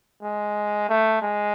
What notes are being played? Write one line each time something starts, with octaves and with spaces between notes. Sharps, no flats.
G#3
A3
G#3